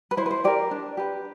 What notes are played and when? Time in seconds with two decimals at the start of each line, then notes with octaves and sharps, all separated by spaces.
0.11 B4
0.17 E4 C5
0.26 B4
0.31 C5
0.44 G4 A#4 D5
0.71 D4
0.97 G4 B4